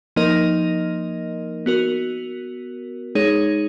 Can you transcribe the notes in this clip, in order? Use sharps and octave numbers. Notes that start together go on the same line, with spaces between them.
F3 A#3 D#4 A#4 D#5
B3 F#4 A#4
G#3 D#4 G#4 C#5